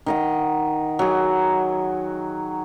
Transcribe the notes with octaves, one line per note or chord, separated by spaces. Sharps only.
D#3 D#5 F#5
F#3 G#4